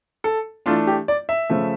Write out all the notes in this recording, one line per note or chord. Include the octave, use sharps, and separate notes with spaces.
A4
E3 A3 D4 F4
G4
D5
E5
C#3 F3 A3